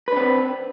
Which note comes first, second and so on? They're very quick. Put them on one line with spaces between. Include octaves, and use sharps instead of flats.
B4 D4 C4